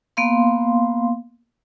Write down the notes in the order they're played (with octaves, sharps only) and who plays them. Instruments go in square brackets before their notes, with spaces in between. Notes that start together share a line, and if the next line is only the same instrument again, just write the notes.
[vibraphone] A#3 B3 F5 C6